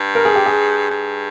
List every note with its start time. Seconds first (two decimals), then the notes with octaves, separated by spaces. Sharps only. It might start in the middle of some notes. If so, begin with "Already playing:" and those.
Already playing: G2
0.15 A#4
0.25 G#4
0.36 G4
0.46 G#4
0.90 G2